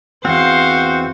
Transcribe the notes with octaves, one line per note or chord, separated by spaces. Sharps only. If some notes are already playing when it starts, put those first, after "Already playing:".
E2 C4 F#4 C5 F5